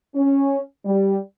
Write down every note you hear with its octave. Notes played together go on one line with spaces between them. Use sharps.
C#4
G3